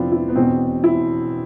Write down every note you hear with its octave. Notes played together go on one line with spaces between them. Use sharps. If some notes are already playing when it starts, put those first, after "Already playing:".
Already playing: F1 D3 F3 B3 C4 D4 E4 F4
E4
B3
E1 E2 B2 C4
E4